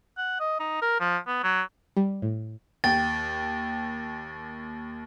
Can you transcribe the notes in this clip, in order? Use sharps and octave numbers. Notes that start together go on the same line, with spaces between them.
F#5
D#5
D#4
A#4
F3
B3
F#3
G3
A2
D#2 G5 A6